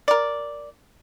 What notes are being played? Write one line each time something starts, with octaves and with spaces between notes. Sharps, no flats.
A#4 D5